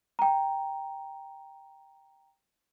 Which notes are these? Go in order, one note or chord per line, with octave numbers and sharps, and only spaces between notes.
G5 A#5